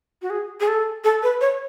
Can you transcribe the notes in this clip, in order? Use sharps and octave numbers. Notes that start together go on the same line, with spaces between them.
F#4
G#4
G#4
A4
A4
B4
C#5